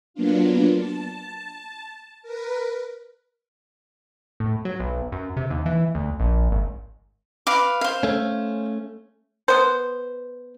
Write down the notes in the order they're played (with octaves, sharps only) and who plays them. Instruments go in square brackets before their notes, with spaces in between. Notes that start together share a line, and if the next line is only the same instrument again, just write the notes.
[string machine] F#3 A#3 B3 D4 F4
A5
A#4 B4
[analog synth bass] A2
F#3
B1
F#2
C3
D#2
E3
D2
A#1
G#1
[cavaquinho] B4 F5 D6
C5 F5
[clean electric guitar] A3 C#4
[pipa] B3 C5